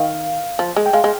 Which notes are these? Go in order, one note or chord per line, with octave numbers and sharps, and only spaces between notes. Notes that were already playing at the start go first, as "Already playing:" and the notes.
Already playing: D#3 F5
F3
G#3
G5
G#3 F5
G#3